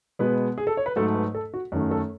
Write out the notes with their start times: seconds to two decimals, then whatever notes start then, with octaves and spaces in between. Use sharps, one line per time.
0.19 B2 G#3 B3 B4
0.58 G#4
0.67 A4
0.77 C#5
0.86 B4
0.96 G#2 F#3 A3 A4
1.14 B4
1.35 A4
1.54 F#4
1.72 F#2 D#3 A3
1.91 A4